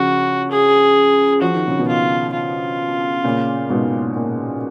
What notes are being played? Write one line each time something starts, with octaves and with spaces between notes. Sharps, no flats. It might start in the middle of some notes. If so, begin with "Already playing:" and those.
Already playing: C#3 F3 F#4
G#4
F3 F#4
D#3
C#3
B2 D#3
F4
F4
A#2 C#3
G#2 B2
A#2